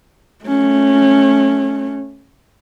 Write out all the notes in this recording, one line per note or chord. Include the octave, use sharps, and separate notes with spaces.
A3 C#4